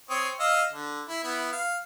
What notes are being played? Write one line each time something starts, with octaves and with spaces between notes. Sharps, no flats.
C4 C#5 D#6
D#5 F5 E6
D3
E4
B3 E4
F5